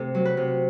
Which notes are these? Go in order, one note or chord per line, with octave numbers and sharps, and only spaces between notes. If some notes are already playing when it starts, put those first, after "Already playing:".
Already playing: C3 A3 A4
F#3
B4
C3